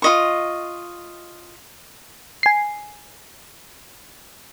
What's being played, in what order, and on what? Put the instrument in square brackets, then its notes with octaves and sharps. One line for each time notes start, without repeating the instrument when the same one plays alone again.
[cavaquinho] F4 D#5 C#6
[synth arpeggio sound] G#5 C7